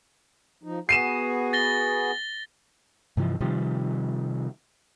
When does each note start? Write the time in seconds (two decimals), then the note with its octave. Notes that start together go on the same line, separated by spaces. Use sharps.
0.63 F3 D#4
0.89 B3 F#4 G#4 C7 D#7 E7
1.53 A6 A#6 G7
3.17 G2 C3 E3 F3
3.40 C3 D#3 F3 G3